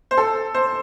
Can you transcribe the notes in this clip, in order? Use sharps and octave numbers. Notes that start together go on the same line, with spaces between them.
C5
A4
C5